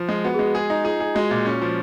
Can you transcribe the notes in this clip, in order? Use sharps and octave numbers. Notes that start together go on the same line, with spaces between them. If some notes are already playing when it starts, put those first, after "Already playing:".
Already playing: F3 F4
G#3
B3 F#4
G#3 G#4
F#4
G#4
D#4
F4 G#4
G#4
G#3 F#4
A#2
C#4
F3